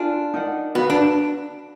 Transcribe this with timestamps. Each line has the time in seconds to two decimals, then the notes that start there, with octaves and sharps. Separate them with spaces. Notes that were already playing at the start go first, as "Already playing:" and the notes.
Already playing: D4 F4 A#4 F5 G#5
0.34 D#4 A#4 D5 F#5
0.75 B3 F#4 B4 F5
0.90 D4